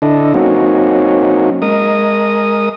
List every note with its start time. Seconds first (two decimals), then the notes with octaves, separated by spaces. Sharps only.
0.02 D3 D4 E4 A4 D#5
0.34 F#3 A#3 C4 C#4 D#4 F#4
1.62 G#3 A#4 D#5 D#6